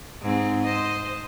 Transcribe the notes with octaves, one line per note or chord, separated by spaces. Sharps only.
G#2 C4
C5 D#5